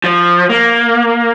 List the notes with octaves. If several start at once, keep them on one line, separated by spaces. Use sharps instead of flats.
F3
A#3